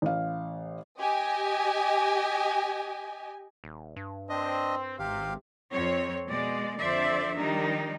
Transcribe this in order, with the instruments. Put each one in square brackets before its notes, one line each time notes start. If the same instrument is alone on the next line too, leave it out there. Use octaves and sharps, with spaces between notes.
[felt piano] A1 F5
[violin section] G4 D#5 G#5
[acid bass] D#1
G2
[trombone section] C4 [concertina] D4 D#5
[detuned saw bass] G#1 [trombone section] C3 [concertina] G4 F5
[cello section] F2 F3 C4 C#5
B2 G#3 D5
F2 D3 F3 C5 D5 E5
D#3 F3 G3 D4 D#4